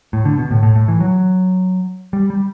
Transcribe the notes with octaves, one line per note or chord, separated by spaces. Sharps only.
A2
D3
B2
A2
A2
A2
E3
F#3
G3
G3